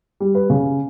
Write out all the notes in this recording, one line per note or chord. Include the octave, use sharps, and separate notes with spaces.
G3
B4
C#3